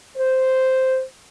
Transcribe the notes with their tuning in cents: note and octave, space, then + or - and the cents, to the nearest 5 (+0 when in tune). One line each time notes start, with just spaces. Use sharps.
C5 -5